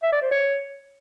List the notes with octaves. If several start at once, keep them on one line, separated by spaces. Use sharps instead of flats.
E5
D5
C5
C#5